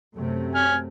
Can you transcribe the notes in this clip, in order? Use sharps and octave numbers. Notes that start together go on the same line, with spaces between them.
F#2 C3 A3
G#5 F6